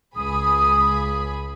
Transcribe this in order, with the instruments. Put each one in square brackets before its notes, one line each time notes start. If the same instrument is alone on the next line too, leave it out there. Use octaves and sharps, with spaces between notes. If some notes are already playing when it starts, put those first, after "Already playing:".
[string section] C#2 G#4 B5 [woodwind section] D#6